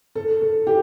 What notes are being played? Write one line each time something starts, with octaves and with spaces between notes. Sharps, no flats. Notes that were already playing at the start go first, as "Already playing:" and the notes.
A4
A4
G4